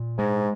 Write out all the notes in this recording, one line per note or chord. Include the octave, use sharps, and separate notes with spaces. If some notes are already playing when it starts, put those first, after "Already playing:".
Already playing: A#2
G#2 G#3